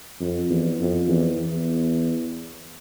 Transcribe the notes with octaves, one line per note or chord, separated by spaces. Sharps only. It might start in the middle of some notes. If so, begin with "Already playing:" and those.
F2
E2
F2
E2
E2